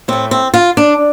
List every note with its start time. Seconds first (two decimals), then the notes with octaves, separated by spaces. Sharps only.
0.08 A2 A3 C4
0.31 C4
0.54 F4
0.77 D4